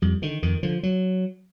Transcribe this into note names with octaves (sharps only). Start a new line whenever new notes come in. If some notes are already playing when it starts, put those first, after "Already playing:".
F2 G3
D3 D#3
F2 D#3
D3 F3
F#3